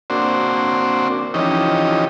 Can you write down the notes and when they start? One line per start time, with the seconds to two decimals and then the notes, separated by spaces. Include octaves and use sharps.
0.10 A#3 C4 D4 F#4 C5
1.34 E3 F3 C#4 D#4 G4 D#5